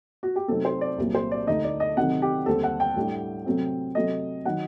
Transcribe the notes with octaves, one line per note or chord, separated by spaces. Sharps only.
F#4
G4
C3 F#3 A3 C4 D#4 A4
C5
D5
C2 A#2 F#3 A#3
C5
D5
D2 D3 A3 D#4 D#5
D5
D#5
C3 D#3 F#3 A3 C4 F#5
G4
D#2 D3 G3 C4 A4
F#5
G5
A2 G3 D4
C3 F#3 A3 C4
C3 F#3 A3 D#5
D#3 F#3 F#5